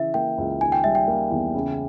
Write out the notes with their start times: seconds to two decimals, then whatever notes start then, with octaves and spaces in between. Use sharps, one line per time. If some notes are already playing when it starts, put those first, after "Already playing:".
Already playing: C#3 E3 E5
0.14 A#3 G5
0.38 C#2
0.61 D#3 G#5
0.72 G5
0.84 G3 E5
0.95 G5
1.08 A#3
1.31 E2
1.55 C#3